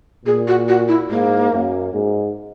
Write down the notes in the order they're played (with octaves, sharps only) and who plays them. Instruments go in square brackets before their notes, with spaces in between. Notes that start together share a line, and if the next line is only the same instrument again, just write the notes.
[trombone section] A#2 [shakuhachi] G#4
[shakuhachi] F#4
F#4
E4
[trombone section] G#2 [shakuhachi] A#3
[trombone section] F#2
G#2